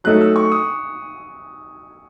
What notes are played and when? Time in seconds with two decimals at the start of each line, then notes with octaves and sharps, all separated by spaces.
0.04 F#3 A3 D#4 A4 F#6
0.21 E6
0.36 C#6
0.52 D#6